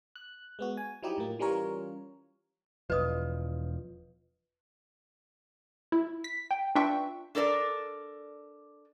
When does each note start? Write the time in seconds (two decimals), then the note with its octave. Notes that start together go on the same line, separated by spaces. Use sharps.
0.15 F#6
0.59 G#3 B3 F#4
0.77 G#5
1.03 F3 F#3 D#4 E4 G4
1.18 A2 A#3
1.39 E3 G3 C#4 F4 A#4 C#5
2.90 E1 C#2 F3 B4 D#5 D#6
5.92 E4
6.24 B6
6.51 G5
6.75 D4 F4 B4 E5 G5 C#6
7.35 D4 A4 A#4 D5